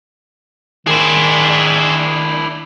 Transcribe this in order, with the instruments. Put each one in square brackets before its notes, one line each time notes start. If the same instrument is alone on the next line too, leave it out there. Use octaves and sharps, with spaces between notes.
[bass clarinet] D#3 [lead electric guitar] D4 E4 [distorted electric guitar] G#4 C5